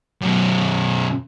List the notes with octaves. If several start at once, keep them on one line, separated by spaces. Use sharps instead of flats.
F#2 B2